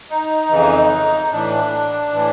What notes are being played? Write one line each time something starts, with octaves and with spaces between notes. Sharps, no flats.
D#4
F2 C#3 E3
A2 E3 D4
A2 E3